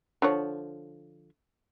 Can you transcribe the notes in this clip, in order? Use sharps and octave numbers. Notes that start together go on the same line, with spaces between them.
D3 F3 C#5